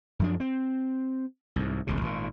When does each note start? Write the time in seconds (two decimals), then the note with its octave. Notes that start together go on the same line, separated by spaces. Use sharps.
0.19 F#2 F3 D4
0.40 C4
1.56 C2 G#2
1.87 E1 C#2 C3
2.01 G#1 A#2